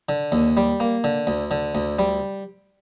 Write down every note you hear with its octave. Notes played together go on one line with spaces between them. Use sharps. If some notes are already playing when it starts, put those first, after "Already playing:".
D3
D#2
G3
A#3
D3
D2
D3
D2
G3